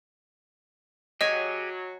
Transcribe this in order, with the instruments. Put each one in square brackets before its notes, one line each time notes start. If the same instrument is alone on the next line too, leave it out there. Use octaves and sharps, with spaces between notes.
[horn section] F#3 [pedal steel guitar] G4 G#4 [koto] C#5 G#5 [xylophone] D#5